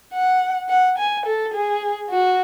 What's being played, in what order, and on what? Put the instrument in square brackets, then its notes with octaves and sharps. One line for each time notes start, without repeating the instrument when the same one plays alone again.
[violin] F#5
F#5
G#5
A4
G#4
F#4